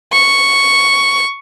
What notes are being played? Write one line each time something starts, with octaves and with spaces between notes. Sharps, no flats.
C#6